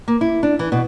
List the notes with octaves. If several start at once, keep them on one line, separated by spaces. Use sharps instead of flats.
A#3
E4
D4
E3
B2